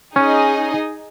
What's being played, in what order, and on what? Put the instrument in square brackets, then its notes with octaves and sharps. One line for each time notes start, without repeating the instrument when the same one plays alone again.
[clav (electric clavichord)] C#4 [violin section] D#4 G#4 D#5 G#5